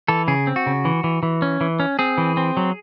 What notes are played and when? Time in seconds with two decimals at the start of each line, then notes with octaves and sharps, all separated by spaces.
0.08 E3 A4
0.28 C#3 G#4
0.47 C4
0.56 F#4
0.66 C#3
0.85 E3
1.04 E3
1.23 E3
1.42 C#4
1.61 E3
1.80 C#4
1.99 C4 G#4
2.18 E3
2.37 C4
2.57 F#3